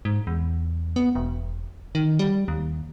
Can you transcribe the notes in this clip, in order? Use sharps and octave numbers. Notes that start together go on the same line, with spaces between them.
G#2
E2
B3
E1
D#3
G3
D#2